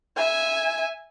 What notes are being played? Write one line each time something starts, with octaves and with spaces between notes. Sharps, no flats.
E5 G#5